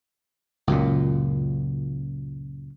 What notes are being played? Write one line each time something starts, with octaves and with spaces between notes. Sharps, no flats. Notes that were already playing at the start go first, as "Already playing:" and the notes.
C#2 F#2 A#2